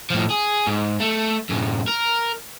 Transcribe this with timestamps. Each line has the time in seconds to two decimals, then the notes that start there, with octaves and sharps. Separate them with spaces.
0.10 A2 F3
0.30 G#4
0.67 G#2
1.00 A3
1.49 F#2 A2
1.88 A#4